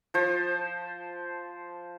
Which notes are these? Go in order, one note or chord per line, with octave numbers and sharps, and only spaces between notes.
F3 C5